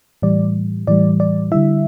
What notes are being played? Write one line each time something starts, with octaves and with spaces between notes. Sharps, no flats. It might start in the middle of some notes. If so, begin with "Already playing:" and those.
A2 E3 G3 D5
A2 E3 G3 D5
D5
D3 G3 E4 E5